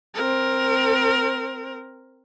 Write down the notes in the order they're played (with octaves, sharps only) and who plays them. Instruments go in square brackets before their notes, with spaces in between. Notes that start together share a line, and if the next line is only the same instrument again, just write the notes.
[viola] C4 A#4